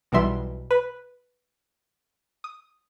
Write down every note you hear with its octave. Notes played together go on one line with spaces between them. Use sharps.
B1 B2 E3 G3 E5 C6
B4
D#6